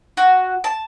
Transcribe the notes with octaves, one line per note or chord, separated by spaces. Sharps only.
F#4
A5